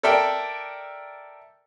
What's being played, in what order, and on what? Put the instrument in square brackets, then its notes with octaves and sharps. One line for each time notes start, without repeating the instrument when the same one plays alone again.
[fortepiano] A4 A#4 D5 E5 G5